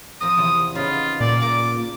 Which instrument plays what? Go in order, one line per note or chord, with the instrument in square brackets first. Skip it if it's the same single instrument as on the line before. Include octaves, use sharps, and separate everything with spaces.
[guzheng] F3 C4 A#4 [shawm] D#6
[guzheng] E2 C3
[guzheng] C#3 B3 D#4 [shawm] F4
[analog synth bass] A#2 [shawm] D5
[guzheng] A#3 A#4 [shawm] D6